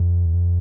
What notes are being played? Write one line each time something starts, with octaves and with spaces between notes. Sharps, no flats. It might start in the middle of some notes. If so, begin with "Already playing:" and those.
Already playing: F2
E2
F2